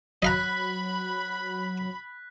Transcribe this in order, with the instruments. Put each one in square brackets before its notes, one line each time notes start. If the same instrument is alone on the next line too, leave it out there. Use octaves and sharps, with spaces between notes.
[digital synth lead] F#3 [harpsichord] D#5 F5 A#5 [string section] B5 [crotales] F#6 B6